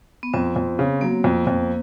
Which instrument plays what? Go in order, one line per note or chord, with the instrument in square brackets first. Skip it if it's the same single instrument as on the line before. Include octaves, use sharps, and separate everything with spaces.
[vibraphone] B3
[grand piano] F2 [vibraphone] C4
[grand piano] F2
C#3
[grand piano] F#3 [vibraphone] A#3
[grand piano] F2
F2